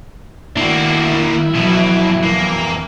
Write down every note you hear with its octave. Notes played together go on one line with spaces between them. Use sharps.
D#3 A#3 C4 D4 E4 F#4
F2 B2 E3 F#3
A#3